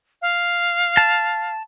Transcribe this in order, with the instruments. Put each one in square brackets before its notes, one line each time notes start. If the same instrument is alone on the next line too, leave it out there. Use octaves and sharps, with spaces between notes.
[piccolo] F5
[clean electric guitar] A5